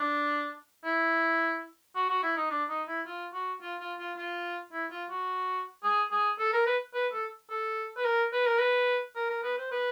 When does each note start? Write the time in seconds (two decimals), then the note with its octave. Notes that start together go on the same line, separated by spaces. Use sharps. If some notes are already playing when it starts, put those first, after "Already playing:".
Already playing: D4
0.85 E4
1.95 F#4
2.09 F#4
2.23 E4
2.37 D#4
2.51 D4
2.70 D#4
2.88 E4
3.06 F4
3.34 F#4
3.62 F4
3.80 F4
3.99 F4
4.17 F4
4.72 E4
4.91 F4
5.10 F#4
5.83 G#4
6.11 G#4
6.39 A4
6.53 A#4
6.66 B4
6.94 B4
7.13 A4
7.50 A4
7.97 B4
8.05 A#4
8.33 B4
8.46 A#4
8.59 B4
9.16 A#4
9.30 A#4
9.43 B4
9.58 C5
9.72 B4